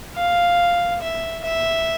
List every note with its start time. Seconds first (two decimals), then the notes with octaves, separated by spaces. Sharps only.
0.16 F5
1.02 E5
1.44 E5